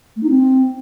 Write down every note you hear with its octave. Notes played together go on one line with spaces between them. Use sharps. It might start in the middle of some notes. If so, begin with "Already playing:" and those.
A3
D#4
C4